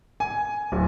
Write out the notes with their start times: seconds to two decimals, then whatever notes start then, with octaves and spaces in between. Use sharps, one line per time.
0.20 G#5
0.72 D1